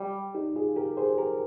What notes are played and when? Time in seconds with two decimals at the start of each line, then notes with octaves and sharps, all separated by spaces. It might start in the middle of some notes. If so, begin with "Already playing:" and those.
Already playing: G3
0.35 D#4 G4
0.56 F4 G#4
0.76 G4 A#4
0.97 G#4 C5
1.18 G4 A#4